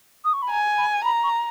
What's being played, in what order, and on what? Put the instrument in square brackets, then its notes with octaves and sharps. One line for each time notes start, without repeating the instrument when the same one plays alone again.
[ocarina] D#6
C#6
B5
[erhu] G#5 [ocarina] A#5
[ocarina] B5
[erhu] A#5 [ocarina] B5
[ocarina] C#6